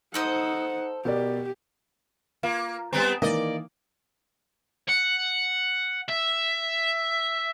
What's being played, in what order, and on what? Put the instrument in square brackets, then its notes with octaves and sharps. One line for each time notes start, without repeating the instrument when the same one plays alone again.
[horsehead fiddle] D#4 F#5 [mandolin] A4 C5 D#6
[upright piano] B2 A#4 D5 [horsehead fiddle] G4
[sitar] A#3 [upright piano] F4
[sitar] G3 B3 C4 [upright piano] A#5 C6
[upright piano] D#3 E3 A#3 [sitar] D5 D#5
[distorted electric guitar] F#5
E5